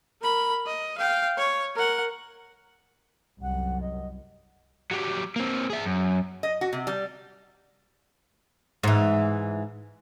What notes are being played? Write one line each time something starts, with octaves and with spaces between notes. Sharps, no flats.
A#4 B5
D#5
F5 G5
C#5
A#4 F#5
C2 F#2 F#5
D#5
F#3 G3
A#3 C4
G#4 E5
F#2
D#5
F#4
C3
G3
G#2 E3